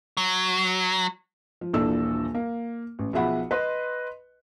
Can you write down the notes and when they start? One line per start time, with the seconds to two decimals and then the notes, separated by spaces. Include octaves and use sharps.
0.17 F#3
1.61 F3
1.73 D#1 A#1 E3 D4 A4 E6
2.35 A#3
2.99 A1
3.13 B1 F3 G#4 E5 F#5 B5
3.51 B4 D#5 C6